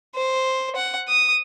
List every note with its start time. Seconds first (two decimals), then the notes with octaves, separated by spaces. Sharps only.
0.15 C5
0.76 F#5
1.08 D#6